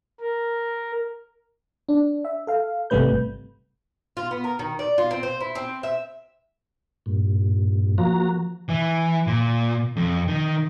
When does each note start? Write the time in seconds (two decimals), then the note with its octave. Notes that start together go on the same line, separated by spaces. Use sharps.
0.20 A#4
1.89 D4
2.25 E5
2.47 A4 F5
2.90 G#1 C3 G3 A3 B4 G6
4.17 F4
4.31 B3
4.44 A#4
4.59 D#3
4.79 D5
4.98 F4
5.11 C4
5.23 C5
5.41 E4
5.55 C4
5.83 E5
7.06 G2 A#2
7.98 F3 A#3 F#4 A#5
8.69 E3
9.27 A#2
9.96 F2
10.28 D#3